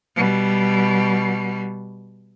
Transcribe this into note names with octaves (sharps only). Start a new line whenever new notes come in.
B2 G3